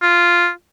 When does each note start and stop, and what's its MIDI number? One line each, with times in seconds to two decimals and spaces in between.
0.02 0.49 65